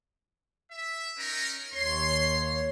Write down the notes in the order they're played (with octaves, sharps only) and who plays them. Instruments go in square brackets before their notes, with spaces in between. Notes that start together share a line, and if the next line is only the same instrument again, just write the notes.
[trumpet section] E5
C#4 D#4 A#4
[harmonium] D#2 C#5 [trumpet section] C6